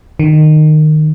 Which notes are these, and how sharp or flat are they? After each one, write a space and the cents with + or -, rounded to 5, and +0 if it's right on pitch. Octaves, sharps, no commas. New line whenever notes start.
D#3 -20